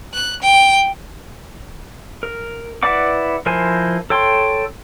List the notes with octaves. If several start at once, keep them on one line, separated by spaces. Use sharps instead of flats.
F#6
G5
A#4
E4 B4 D5 F#5 D6
F3 E4 A#4 C5 G#5
A4 C#5 G5 C6